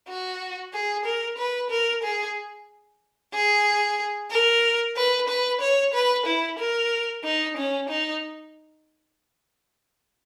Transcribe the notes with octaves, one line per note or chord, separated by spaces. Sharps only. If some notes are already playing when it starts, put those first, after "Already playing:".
F#4
G#4
A#4
B4
A#4
G#4
G#4
A#4
B4
B4
C#5
B4
E4
A#4
D#4
C#4
D#4